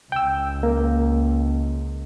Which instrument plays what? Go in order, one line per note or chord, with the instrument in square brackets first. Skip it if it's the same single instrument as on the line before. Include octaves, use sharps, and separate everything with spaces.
[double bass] C#2 [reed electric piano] G5 E6
[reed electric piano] A#3